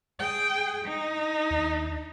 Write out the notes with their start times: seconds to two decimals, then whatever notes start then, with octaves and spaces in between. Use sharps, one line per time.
0.19 G#4 G5
0.85 D#4
1.50 D#2